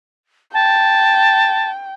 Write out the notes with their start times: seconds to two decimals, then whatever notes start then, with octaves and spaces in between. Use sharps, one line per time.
0.54 G5 A5